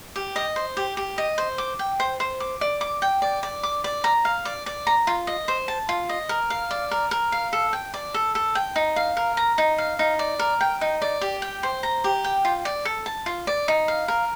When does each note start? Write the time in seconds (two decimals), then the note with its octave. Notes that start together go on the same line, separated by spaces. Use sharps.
0.16 G4
0.36 D#5
0.56 C5
0.77 G4
0.97 G4
1.18 D#5
1.38 C5
1.58 D6
1.79 G5
2.00 C5
2.20 C5
2.40 D6
2.61 D5
2.81 D6
3.02 G5
3.22 D5
3.43 D5
3.63 D6
3.84 D5
4.04 A#5
4.25 F5
4.45 D5
4.66 D5
4.87 A#5
5.07 F4
5.27 D#5
5.48 C5
5.68 A5
5.89 F4
6.09 D#5
6.29 A#4
6.50 F5
6.71 D5
6.91 A#4
7.11 A#4
7.32 F5
7.53 A4
7.73 G5
7.94 D5
8.14 A4
8.35 A4
8.55 G5
8.76 D#4
8.96 F5
9.17 A#4
9.37 A#5
9.58 D#4
9.78 F5
9.99 D#4
10.19 D5
10.39 A#4
10.61 G5
10.81 D#4
11.02 D5
11.21 G4
11.42 G5
11.63 C5
11.83 A#5
12.04 G4
12.24 G5
12.45 F4
12.65 D5
12.85 A4
13.06 A5
13.26 F4
13.47 D5
13.68 D#4
13.88 F5
14.08 A#4